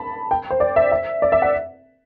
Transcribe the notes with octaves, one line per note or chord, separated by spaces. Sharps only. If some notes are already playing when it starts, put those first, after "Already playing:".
Already playing: A5 B5
G5
C5
D5
E5
E5
D5
E5
F#5